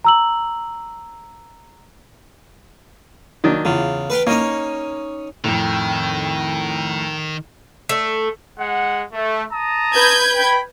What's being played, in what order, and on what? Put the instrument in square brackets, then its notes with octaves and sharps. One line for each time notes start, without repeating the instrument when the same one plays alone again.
[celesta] A#5 E6 F#7
[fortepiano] D#3 F#3 D4
[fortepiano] E2 F4 [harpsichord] C#3
[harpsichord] B4 F5 G5
[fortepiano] A#3 [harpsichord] C#4 D#4 C#5
[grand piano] F2 A2 [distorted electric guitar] D#3 [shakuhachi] G5
[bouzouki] A3
[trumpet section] G#3 F#5
A3
A5 A#5 D#6
[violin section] B4 G6 G#6
[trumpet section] G5 B5